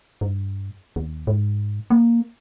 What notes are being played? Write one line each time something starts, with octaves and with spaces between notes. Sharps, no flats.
G2
D#2
G#2
A#3